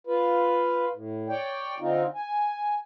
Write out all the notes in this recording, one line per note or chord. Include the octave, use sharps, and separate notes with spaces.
F4 B4
A2
C#5 D5 G5
D3 C4 D#4 F4
G#5